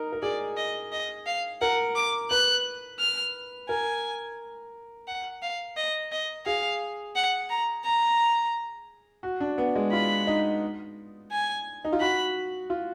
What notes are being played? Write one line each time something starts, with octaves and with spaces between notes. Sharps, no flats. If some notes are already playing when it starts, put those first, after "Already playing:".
Already playing: D#4 A#4
A#4
G#4 D5
D#5
D#5
F5
A#4 F#5
D6
B4 F#6
F6
A#4 G#5
F#5
F5
D#5
D#5
G#4 F5
F#5
A#5
A#5
F#4
D4
B3
G#3
F4 B5
D#4
G#5
D#4
F4
F#4 B5
F4